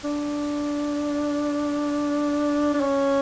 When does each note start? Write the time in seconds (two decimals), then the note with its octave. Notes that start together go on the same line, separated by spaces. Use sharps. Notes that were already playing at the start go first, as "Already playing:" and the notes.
0.04 D4
2.74 D4
2.80 C#4